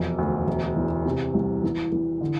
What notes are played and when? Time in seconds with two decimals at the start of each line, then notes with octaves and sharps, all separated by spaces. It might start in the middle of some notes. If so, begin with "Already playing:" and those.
Already playing: E1 F2
0.18 D2
0.48 E1
0.76 E2
1.06 C3
1.34 C2
1.63 E3
1.92 E3
2.21 D3